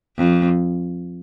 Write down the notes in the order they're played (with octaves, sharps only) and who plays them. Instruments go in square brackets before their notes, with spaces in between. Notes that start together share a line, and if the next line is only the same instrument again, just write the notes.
[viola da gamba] F2